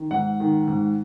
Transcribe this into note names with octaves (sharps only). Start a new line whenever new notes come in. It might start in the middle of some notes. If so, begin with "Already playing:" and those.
Already playing: D#3
G#2 F#5
D#3
G#2